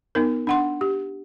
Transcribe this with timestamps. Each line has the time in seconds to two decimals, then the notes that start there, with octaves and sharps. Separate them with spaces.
0.15 B3 D#4 A#4
0.47 D4 F#5 C6
0.81 G4